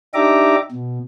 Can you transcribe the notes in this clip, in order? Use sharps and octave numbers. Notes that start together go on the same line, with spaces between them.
D4 D#4 G4 E5 A#5 D6
B2